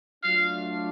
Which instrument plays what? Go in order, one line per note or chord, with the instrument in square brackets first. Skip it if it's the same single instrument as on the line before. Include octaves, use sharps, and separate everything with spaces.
[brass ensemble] F#3 A3 D4 F4 [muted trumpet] F5